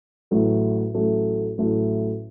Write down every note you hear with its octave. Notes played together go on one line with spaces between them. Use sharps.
A1 A2 F#3 A3
A1 A2 F#3 A3
A1 A2 F#3 A3